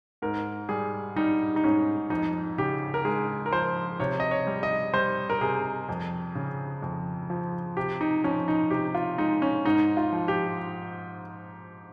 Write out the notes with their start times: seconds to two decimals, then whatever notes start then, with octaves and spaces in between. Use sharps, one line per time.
0.22 G#2 A#4
0.69 G3 G#4
1.16 G3 D#4
1.56 D#4
1.64 G#2 C#4
2.10 F2 D#4
2.58 C#3 G4
2.94 A#4
3.05 G#3 G#4
3.46 A#4
3.52 F3 C5
4.00 C3 C#5
4.20 D#5
4.31 C#5
4.47 G3
4.63 D#5
4.94 G3 C5
5.30 A#4
5.41 C3 G#4
5.89 F2
6.35 C#3
6.82 F2
7.30 F3
7.77 C3 G4
8.01 D#4
8.24 F3 C#4
8.48 D#4
8.71 C3 G4
8.95 F4
9.18 G#3 D#4
9.42 C#4
9.65 G#2 D#4
9.97 F4
10.13 F3
10.28 G4